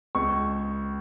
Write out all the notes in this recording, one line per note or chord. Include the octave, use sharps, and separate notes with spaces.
C#2 C#6